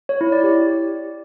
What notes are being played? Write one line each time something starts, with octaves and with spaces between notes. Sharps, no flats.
C#5
E4
D5
G4